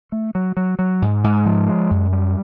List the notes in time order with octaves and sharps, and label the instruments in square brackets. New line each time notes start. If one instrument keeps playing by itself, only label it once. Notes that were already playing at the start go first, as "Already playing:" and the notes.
[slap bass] A3
F#3
F#3
F#3
G#2
G#2
F3
G#3
F#2
G3